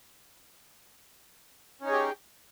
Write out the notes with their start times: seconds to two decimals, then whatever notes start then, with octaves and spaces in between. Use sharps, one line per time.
1.81 C#4
1.84 D#4
1.87 C#5
1.90 G#4
1.93 G4